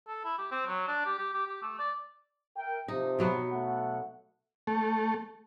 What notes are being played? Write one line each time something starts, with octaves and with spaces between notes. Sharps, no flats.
A4
E4
G4
C4
F#3
D4
G4
G4
G4
G4
A3
D5
A#4 E5 G5
C3 F3 D#4
B2 F#3 B3
A3 F#5
A3